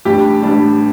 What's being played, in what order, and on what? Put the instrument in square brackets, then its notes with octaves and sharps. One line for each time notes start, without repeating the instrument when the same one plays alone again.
[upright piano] A1 A2 G3 D4 [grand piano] G4
[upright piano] A1 A2 G3 D4